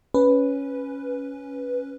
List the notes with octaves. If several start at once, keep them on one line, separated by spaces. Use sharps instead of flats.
C#4 B4